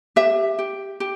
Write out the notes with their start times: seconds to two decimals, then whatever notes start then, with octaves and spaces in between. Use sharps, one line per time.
0.16 G4 E5
0.59 G4
1.00 G4